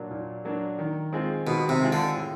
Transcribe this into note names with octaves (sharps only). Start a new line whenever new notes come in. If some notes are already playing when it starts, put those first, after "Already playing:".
Already playing: A#2 F#3 A#3 D4
A#2
F#3 A#3 D4
D#3
G#3 C4 F4 G#4
B2 D#3
C3
G#3 C4 F4 G#4
D3
A2